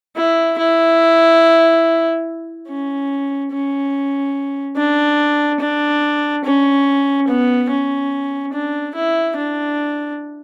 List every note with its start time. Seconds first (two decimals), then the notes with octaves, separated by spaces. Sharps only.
0.16 E4
0.58 E4
2.68 C#4
3.52 C#4
4.76 D4
5.60 D4
6.44 C#4
7.28 B3
7.70 C#4
8.53 D4
8.95 E4
9.37 D4